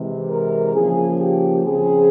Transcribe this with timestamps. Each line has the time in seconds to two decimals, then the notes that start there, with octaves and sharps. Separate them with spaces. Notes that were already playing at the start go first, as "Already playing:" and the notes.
Already playing: C3 E3 G#3
0.29 A#4
0.74 C#3 F3 A#3 G#4
1.19 G4
1.65 C#3 F3 C4 G#4